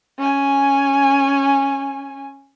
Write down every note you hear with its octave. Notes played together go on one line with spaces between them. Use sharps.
C#4 G#5